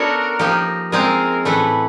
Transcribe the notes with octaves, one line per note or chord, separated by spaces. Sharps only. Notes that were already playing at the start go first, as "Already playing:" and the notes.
Already playing: B3 D4 F#4 A4 A#4 C#5
F3 A#3 D#4 G4
G#3 C4 F4 G#4 A#4 C5
A2 E3 A3 B4